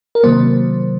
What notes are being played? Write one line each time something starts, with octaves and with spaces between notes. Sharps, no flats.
A#4
C3 D#3 F#3 A#3 C5